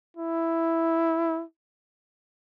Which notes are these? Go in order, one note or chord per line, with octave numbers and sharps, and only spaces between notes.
E4